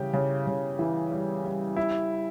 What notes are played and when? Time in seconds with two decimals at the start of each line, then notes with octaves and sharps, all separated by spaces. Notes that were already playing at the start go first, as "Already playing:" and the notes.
Already playing: C#3 E3 G3 G4
0.13 C#3
0.47 C#3
0.79 E3
1.12 G3
1.45 G3
1.76 E4